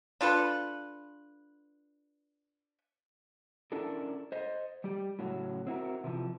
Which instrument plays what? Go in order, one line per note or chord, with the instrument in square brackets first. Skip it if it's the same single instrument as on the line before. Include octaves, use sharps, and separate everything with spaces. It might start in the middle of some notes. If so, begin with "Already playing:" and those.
[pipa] D4 F4 A4 B4
[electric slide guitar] C#4 D4 E4 A4 A#4
C5 D#5
G3 G4
A2 C#3 F#3
C4 E4 F#4 A#4
C3 E3 F3